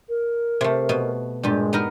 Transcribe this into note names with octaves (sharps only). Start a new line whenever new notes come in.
A#4
C3 A3
B2
G2 A#2 G#3 G4
B3 D#4 A#4